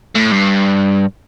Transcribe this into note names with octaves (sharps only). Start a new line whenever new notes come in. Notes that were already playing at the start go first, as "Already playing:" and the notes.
A2
G2